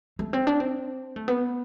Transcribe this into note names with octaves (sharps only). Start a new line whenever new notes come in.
A3
C4
D4
C4
A3
B3